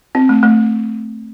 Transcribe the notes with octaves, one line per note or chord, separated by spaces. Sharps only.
C4
A3
A3